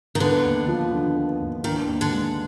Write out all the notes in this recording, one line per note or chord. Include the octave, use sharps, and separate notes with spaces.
D#3
D3 B3
D#2
F3
D3
B3
D#2
D#3 D4
D#2
D3
G#3